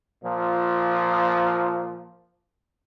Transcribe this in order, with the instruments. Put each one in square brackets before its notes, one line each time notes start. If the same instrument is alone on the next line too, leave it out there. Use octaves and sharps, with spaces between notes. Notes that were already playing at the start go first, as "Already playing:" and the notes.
[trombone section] A#2 F3